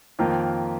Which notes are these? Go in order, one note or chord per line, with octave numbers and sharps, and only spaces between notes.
F2 D#3 A#3 F4 A#4